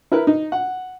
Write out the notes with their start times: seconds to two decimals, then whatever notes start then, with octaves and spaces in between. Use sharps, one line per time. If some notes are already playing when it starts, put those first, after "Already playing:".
0.11 E4 A#4 B4
0.27 D#4
0.52 F#5